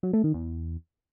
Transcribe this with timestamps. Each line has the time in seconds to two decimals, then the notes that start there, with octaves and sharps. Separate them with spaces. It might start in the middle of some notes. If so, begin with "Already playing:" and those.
0.03 F#3
0.13 A3
0.24 D#3
0.34 E2